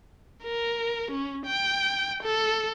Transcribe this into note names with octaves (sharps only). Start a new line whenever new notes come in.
A#4
C#4
G5
A4